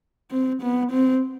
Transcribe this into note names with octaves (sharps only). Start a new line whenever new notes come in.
C4
B3
C4